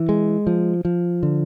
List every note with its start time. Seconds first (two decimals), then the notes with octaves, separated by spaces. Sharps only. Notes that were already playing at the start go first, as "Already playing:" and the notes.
Already playing: E3
0.09 G#3
0.47 F3
0.85 F3
1.23 D3